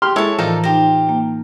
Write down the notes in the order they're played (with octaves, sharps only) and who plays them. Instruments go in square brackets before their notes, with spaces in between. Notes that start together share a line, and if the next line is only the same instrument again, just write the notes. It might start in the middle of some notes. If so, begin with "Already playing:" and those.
[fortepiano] G4 C6 F6
[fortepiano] G#3 E4 A4 [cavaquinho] C#5 A5
[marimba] A2 E3 [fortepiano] F3 A#4 [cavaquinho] D#4 A4 D5
[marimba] D#4 A#6 [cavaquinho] G4 C5
[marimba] A#3